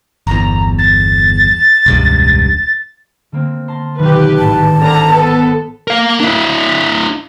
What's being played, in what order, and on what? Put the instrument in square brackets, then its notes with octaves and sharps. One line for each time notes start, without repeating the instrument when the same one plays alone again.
[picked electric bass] G1 E2 [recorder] A#5
[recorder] A6
[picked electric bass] E1 C#2 G2
[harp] D3 A#3 C4
A5 A#5 C6
[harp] B1 D#3 [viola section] G4 B4
[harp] G#1 A2 [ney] A5
[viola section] D3 A#5 [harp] C4 A#4
[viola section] B3 A4
[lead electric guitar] A#4 F5
D4 E4